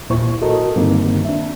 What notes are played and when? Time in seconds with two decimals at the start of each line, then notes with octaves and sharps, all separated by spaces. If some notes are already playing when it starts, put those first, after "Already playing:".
0.10 D#2 A#2 E4 C5 C#6
0.41 F#4 A4 A#4 D#5
0.76 G2 D3 D#3 A#3 C4 D#4
1.25 D4 E5